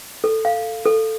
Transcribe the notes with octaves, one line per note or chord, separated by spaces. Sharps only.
A4
F5
A4